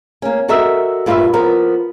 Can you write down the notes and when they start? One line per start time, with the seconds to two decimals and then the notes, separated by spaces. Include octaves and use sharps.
0.22 A#3 C#4
0.48 F#4 A4 A#4 D#5 E5
1.06 G2 A#2 F4 G4 B4 E5
1.33 F3 B3 A#4